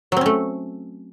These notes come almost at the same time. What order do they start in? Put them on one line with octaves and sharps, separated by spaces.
F#3 C4 C#4 A3